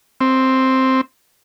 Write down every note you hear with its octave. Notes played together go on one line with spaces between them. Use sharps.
C4